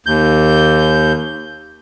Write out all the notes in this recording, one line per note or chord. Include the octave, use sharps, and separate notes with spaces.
D#2 G6